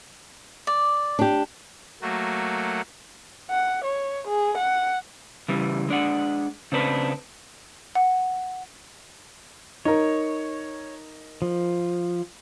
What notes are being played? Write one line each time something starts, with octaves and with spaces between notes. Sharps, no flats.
D5
D4 G4
F#3 A3 A#3 F#4
F#5
C#5
G#4
F#5
C#3 E3 G3
G#3 D4 F#5
C#3 C4 D4 B4
F#5
D#4 A#4 C#5
F3